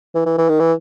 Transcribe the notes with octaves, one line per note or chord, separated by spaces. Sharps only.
E3
E3
E3
D#3
E3